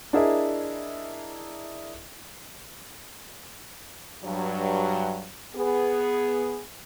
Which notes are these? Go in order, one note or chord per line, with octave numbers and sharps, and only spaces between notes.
D4 E4 G#4 A#4 D#5 E5
G2 F#3
B3 G#4